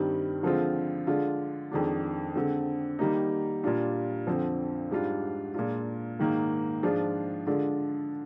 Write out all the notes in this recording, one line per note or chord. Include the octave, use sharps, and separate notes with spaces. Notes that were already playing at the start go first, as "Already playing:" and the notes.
Already playing: G2 D#3 G3 C4
D3 F3 G#3 C4 F4
D3 G#3 D4 F4
F2 D#3 G#3 D4
D3 G#3 C4
D#3 G3 A#3 D#4
A#2 G3 D4 F4
F2 D3 F3 C4
G#2 G3 D4 F4
A#2 G#3 D4 F4
G#2 D#3 A#3
G#2 F3 G#3 D4 F4
D3 G#3 D4 F4